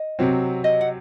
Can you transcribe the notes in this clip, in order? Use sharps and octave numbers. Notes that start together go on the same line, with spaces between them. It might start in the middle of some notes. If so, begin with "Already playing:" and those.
Already playing: D#5
C3 F#3 C4
D#5
F#5